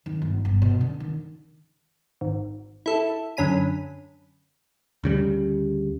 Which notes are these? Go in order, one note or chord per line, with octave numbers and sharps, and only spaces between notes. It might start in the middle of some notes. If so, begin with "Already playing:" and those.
D#3
G1
G1
B2
D3
D#3
G#1
E4 A4
F#2 D3 C#4 B5 D#7
D2 C#3 G3